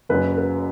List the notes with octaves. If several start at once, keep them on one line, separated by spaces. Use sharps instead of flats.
F#1 F#2 C#3 F#3 B4
B4